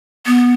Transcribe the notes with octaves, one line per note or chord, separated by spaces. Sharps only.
B3